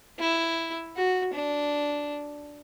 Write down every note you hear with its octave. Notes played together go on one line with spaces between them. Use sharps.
E4
F#4
D4